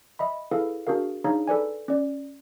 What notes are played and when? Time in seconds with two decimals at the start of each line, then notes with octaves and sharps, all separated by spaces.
0.19 D#5 E5 B5
0.51 E4 G#4 A4 B4 F5
0.87 D4 F#4 G#4 A#4 F5
1.24 D4 D#4 G#4 C#5 F5 A#5
1.47 A4 B4 D5 G#5
1.88 C#4 D5